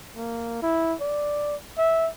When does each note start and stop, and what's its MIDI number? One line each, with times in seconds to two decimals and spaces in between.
0.16 0.60 58
0.62 0.94 64
1.00 1.55 74
1.78 2.09 76